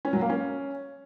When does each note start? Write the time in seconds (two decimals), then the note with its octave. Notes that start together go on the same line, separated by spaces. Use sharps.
0.05 C#4
0.13 F#3
0.21 A#3
0.30 C#4